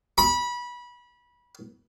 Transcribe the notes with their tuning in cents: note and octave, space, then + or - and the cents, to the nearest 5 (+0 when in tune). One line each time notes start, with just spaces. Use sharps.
B5 -25